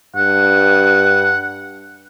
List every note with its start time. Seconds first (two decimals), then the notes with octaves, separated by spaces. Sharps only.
0.16 G2 F#5